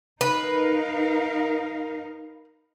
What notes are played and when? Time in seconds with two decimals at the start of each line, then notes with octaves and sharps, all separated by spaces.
0.21 D#4 A#4 B4 F5